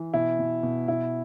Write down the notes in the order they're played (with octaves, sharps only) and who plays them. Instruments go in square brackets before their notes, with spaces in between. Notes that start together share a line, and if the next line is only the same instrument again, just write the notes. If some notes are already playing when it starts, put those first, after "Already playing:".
Already playing: [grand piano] E3
B2 E4
B2
B2
B2 E4